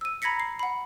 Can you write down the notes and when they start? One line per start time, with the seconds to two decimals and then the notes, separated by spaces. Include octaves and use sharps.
0.01 E6 D#7
0.22 A#5 B5 G#6 A#6 B6 C#7
0.40 C7
0.59 F#5 B5